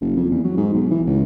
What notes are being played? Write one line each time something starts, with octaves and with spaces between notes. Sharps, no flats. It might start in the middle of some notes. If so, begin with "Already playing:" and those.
F#1
F2
E2
F#3
G#2
B1
E3
C#2